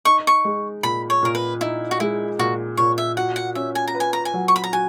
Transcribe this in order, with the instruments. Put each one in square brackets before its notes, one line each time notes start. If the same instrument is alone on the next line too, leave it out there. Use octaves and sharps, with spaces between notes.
[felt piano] D#4 [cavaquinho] C#6
[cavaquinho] C#6
[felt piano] G#3
[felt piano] A#2 [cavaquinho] B5
[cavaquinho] C#5
[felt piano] A#2 [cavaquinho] A#4
[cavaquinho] B4
[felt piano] D#4 [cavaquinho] E4
[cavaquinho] F#4
[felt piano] G#3 [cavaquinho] E4
[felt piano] A#2 [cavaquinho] F#4
[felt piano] A#2 [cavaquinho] C#5
[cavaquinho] E5
[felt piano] F#4 [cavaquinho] F#5
[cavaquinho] F#5
[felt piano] C#4 [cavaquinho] E5
[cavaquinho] G#5
A#5
[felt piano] B4
[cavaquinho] G#5
A#5
G#5
[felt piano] F#3
[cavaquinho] C#6
B5
A#5
[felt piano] F#4 [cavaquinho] G#5